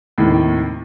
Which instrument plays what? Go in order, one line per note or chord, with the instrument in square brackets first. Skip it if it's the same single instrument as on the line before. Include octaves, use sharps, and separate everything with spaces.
[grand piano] D#2 A2 C3